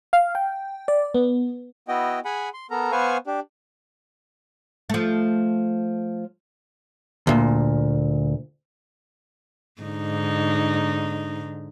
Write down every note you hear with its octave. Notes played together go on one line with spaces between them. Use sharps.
F5
G5
D5
B3
B3 E4 F#4 D#5 G5
G#4 F#5 G#5 B5
C6
B3 A4 A#4 A#5
B3 B4 C5 F5 G#5 C#6
D4 G4
F3 A3
D2 A#2
G#2 D3 D#4